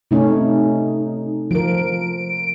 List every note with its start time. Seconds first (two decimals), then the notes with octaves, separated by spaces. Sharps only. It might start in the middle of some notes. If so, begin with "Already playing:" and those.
0.11 C3 A3 C#4 D#4
1.51 F3 A#4 D7